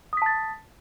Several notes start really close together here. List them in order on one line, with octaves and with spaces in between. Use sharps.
D#6 B6 A5 A6